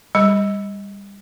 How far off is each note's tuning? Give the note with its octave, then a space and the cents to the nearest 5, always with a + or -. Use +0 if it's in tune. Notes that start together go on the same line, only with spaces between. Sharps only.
G3 +25 B5 +0